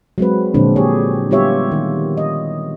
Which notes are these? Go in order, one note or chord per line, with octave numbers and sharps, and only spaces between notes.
F#3 G#3 C4 B4
A#2 D3 F3 G#3 C4 D4
G4 G#4 C#5
G3 B3 F4 G4 C#5 E5
D#3
D#5